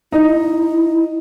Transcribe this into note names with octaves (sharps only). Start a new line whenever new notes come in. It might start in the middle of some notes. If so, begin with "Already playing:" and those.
D#4 E4